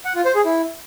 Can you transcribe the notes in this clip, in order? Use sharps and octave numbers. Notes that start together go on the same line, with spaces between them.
F#5
F4
C5
G#4
E4